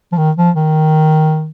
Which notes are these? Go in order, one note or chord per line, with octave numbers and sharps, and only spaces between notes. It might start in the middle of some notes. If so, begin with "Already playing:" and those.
F3
D#3
F3
D#3